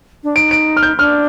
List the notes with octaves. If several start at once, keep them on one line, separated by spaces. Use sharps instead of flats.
D4
D#4 D7
D7
F6
G6
D4 F6